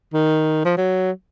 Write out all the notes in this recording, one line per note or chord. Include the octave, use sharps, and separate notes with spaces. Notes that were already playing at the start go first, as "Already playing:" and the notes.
D#3
F3
F#3